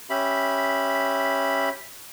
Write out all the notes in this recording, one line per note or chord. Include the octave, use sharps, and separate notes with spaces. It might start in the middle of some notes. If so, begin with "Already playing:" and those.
C#4 G4 E5 B5